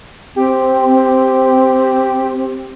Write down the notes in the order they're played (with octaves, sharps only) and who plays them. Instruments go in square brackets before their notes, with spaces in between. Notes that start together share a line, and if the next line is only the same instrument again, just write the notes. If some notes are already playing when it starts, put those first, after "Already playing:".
[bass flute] C4 [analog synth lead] G4